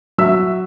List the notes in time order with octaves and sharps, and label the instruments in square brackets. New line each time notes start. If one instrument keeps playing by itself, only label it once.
[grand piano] F#3 E5 E6